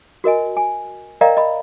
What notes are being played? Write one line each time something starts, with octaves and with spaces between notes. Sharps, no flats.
F#4 A#4 D#5 G#5
G#5
A#4 D5 D#5 F5 G5 A#5
D#5 B5